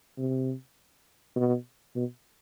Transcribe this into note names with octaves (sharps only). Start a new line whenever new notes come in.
C3
B2
B2